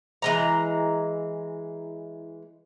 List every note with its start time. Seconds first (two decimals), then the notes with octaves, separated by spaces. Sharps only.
0.22 E3 G#3 A#5